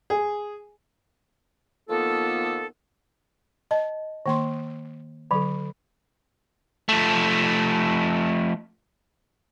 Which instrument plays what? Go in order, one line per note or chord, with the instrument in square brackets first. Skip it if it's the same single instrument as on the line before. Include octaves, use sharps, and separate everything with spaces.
[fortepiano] G#4
[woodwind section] D#3 F3 A#3 B3 F4 A4
[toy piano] D#5 [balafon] A5
[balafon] D#3 A#3 C6
[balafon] D3 F#3 [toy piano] A4 B5
[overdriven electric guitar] F3 A3